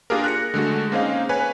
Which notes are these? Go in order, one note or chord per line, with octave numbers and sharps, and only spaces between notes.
A#3 D4 F4 G4 G#4 A#4
F#6 A#6 C#7
D3 G#3 A3 F#4
A#3 C4 C#4 D#4 G#4 F5
B4 C#5 G#5